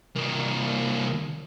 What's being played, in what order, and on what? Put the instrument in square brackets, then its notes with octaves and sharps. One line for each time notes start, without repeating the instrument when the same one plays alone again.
[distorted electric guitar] C2 A#3